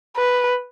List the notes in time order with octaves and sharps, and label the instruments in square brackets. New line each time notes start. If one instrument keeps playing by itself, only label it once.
[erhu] B4